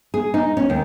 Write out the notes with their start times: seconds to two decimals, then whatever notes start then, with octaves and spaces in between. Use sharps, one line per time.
0.14 G#4
0.34 D#4
0.57 C#4
0.70 D#2